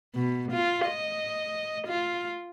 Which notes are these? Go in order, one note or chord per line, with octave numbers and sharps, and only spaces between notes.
B2
F4
D#5
F4